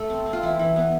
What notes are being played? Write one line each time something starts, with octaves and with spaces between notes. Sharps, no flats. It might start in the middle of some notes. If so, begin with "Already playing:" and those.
Already playing: A3 A4
C4
C4
F4
E3 E4
E3
B3